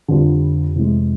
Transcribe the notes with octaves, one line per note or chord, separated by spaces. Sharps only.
F2 D3 G3 C4 F4
C3 E3 G#3